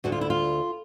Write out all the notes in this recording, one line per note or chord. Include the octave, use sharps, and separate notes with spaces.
D2 D3 F#4
F4
E4
F4